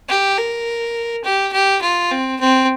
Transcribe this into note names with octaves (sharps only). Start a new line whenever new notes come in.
G4
A#4
G4
G4
F4
C4
C4